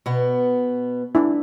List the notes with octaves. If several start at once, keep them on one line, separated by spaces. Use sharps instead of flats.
B2 B3
D4 E4